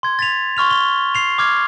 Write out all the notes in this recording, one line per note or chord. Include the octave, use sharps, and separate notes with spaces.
C6 G#6
A6 B6 F7
C6 C#6 F6 F7
G7
C7 F7
D6 F6 G#6